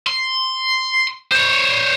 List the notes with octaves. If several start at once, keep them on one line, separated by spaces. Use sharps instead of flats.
C6
C5 C#5